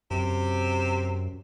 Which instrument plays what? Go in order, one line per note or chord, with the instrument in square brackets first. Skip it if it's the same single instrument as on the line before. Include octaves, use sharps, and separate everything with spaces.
[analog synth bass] F#2 [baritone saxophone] C3